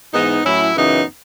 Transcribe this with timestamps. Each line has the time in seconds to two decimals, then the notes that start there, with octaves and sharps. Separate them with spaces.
0.13 G#2 E3 B3 D#4
0.44 A2 F#3 C#4 E4
0.76 F#2 C#3 E3 B3 D#4